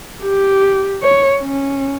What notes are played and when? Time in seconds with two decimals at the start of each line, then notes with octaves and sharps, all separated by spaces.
0.23 G4
1.02 C#5
1.41 C#4